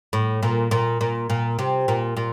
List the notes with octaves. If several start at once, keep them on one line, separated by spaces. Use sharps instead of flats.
A2
A#2
A#2
A#2
A#2
C3
A#2
A#2